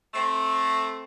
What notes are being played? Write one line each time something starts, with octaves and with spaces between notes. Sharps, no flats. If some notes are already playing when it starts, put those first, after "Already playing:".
A3 C4